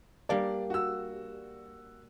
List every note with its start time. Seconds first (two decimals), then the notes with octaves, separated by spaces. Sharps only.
0.29 G3 A#3 D4 D5
0.70 F#4 E6